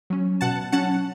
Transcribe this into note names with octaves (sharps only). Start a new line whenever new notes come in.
F#3 C#4
B2 F#5 A5
F#3 C#4 F#5 A5